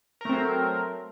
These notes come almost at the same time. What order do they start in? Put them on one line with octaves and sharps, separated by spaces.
A#4 A3 C4 F#3